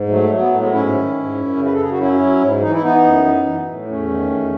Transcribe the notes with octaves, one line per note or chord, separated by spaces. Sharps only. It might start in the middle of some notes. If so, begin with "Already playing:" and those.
Already playing: G#2
F#3 A3
F#3
B3
A2 A3
G#3 B3
G#2 C#4 E4
D#3
G#2
F#2
C#3
B4
A4
F#2 G#4
F#4
F#3 C#4 E4
F#3
G#2
E3 D#4
E4
E3 B3 D#4
F#2
E3
E3
A2
E2 A3 C#4
D#3
E2